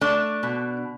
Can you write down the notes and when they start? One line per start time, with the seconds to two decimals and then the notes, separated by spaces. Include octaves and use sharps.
0.01 A3 D4
0.43 B2